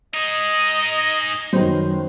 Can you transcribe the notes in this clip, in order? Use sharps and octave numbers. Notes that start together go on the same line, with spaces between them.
D#4 G#4 D#5
F#2 D#3 B3 C5